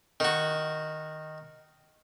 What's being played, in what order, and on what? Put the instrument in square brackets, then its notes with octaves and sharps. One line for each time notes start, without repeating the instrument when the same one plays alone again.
[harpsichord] D#3 F#4